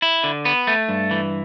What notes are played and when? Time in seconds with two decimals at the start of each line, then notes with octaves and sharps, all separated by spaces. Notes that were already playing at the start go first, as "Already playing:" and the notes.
0.02 E4
0.24 D3
0.45 B3
0.67 A3
0.89 G2
1.11 E3